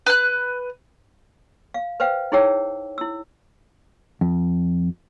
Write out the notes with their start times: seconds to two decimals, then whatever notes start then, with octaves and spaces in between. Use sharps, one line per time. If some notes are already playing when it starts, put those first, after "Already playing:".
0.06 B4 F#6
1.74 F5
2.00 B4 C5 F5 G5
2.32 D#4 E4 G#4 C#5 G5 E6
2.98 E4 E6
4.21 F2